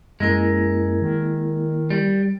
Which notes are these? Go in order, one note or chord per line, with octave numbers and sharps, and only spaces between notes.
F#2 G#3 A#3 E4 A#4
D#3
G3